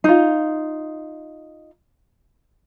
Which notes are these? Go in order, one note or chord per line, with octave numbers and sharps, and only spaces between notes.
D#4 F4